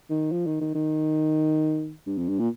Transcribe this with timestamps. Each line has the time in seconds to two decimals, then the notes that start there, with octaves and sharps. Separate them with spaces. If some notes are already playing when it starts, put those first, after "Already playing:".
0.10 D#3
0.32 F3
0.47 D#3
0.61 D#3
0.75 D#3
2.07 G2
2.18 F2
2.29 G2
2.39 A#2